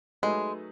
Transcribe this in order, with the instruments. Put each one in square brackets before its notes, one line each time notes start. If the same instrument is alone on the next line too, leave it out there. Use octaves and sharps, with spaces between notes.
[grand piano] F#3 A3 D#4 G#4 B4 [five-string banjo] G#3